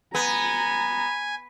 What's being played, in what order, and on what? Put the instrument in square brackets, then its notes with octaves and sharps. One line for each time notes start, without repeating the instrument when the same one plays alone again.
[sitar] B3 [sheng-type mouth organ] G#5 [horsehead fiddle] A#5